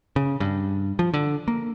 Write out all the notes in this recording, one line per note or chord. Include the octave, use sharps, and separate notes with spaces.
C#3
G2
F3
D3
A#3